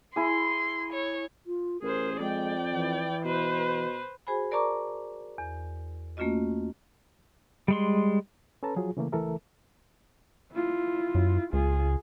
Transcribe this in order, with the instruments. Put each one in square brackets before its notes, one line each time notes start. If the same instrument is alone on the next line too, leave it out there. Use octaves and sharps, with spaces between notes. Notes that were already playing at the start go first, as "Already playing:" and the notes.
[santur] E4 G#4 [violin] C6
[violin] C#5
[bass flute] F4
[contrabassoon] A1 [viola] G#4 C5 [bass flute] A#4
[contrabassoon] F2 [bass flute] G#3 [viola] D5 G5
[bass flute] E3
[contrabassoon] B2 [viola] B4 C5
[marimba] F#4 G#4 C5 G#5 B5
A#4 D5 A5 A#5 C#6 D6
E2
A3 A#3 C#4 F4 F#4 D#5
[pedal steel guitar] G3 G#3 C6
[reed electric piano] C#4 A4 B4 A5 A#5
F3 F#3 F4 G#4
C#3 E3 A3 A#3
C#2 E3 A3 A4 A#4 E5
[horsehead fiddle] E4 F4
[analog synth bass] F#2
[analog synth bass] C#2 [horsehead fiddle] F4 G#4